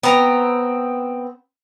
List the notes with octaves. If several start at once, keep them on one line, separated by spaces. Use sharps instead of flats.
B3 C4 A#5